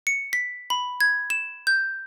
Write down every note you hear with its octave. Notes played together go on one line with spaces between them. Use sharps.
C#7
B6
B5
G#6
E7
G6